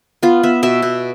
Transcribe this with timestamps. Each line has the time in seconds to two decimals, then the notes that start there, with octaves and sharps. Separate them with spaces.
0.23 B3 F4
0.43 B3 E5
0.63 B2 E5
0.82 B2